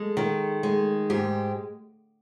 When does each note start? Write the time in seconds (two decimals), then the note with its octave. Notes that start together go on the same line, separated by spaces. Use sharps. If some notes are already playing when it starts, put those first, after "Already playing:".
Already playing: G#3 A4
0.17 D#3
0.63 G#3
1.10 G#2 G4